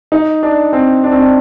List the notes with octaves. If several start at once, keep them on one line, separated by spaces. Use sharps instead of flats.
D#4
D4
C4
D4
C4
D4